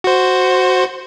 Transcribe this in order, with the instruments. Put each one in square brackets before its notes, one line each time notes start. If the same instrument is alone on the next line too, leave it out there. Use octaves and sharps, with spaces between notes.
[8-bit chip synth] F#4 C5